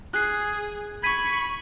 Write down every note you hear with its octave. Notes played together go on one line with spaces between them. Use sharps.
G#4 F#6 C7
B5 C#6 G#6 B6 D#7